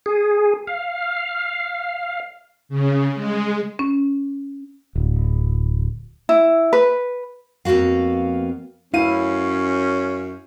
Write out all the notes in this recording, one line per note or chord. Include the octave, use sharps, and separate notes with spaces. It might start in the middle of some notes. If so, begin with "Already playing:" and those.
G#4
F5
C#3
G#3
C#4
D1
E4
B4
F2 A#3 B3 F#4 F5
F#2 C#4 E4 F5 D#7